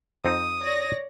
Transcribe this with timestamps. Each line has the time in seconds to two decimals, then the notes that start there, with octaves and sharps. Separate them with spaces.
0.25 F2 C4 D#4 D#6
0.61 C#5 D5 A#6